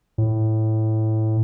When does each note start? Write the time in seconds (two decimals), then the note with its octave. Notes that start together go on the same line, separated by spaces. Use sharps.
0.18 A2